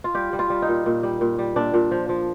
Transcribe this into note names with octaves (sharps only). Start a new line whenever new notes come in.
F4
G3 G4
G3
F4
G3
D#4
A#2
A#2
G3
A#2
G3
A#2 D4
A#2
F3
F3